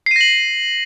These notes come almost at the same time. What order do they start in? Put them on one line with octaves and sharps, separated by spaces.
C7 D#7 A#6 F#7